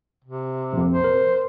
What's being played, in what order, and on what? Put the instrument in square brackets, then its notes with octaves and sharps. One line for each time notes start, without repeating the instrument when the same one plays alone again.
[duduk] C3
[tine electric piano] A#1 F2
[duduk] C5
[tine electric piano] A#4